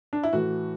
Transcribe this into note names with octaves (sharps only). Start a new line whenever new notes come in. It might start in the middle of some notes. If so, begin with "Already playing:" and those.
D4
E4
A2 E3 F#4